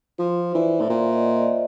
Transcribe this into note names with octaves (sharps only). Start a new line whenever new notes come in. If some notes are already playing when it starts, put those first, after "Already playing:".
F3 C5
E3 D5
A2
A#2 E5
D#5
D#5
D5